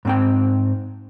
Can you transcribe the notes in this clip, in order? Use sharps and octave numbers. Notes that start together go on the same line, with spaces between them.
G#2 C4 G5